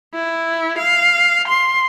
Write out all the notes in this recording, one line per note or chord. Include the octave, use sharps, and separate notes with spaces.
E4
F5
C6